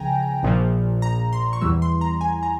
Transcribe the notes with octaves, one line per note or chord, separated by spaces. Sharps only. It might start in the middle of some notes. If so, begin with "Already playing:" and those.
Already playing: C#2 C#3 F3 G5 G#5 A#5
A#1 A#2 F3
A#5
C6
C#6
E2 E3 G3 E6
C6
A#5
G#5
A#5